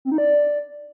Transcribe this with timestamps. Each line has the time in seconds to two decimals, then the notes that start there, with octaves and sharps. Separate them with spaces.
0.05 C4
0.12 D#4
0.18 D5